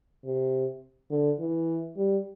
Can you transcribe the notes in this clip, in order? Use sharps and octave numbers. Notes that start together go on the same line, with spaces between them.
C3
D3
E3
G3